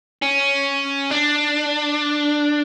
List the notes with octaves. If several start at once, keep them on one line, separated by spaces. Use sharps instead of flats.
C#4
D4